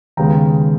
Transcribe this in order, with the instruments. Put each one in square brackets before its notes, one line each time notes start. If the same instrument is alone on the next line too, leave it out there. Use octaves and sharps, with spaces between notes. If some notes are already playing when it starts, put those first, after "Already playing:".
[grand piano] D#2 C#3 G#3 B3 G5 A#5